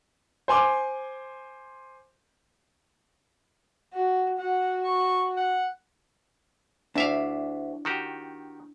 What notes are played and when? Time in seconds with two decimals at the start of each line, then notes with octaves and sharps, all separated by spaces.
0.48 C5 G#5 C6 D6
3.93 F#4
4.39 F#4 F#5
4.85 C#6
5.37 F#5
6.96 D2 D4 E4 D5 E5 F5
7.85 D#3 F#4 G4